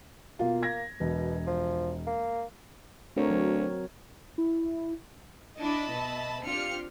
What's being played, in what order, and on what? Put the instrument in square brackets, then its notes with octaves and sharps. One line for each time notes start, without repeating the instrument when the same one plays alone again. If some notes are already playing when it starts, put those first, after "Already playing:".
[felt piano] B2 F4 [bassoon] A#3
[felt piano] G#6 A#6
[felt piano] E1 [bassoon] B2
[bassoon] F3
A#3
[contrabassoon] D2 [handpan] C4 A#4 C#5
[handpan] F#3
[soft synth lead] E4
[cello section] D4 E4 [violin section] D#5 A5 B5
[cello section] B2 E5
[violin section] C4 F6 C#7 [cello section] D4 F4 G4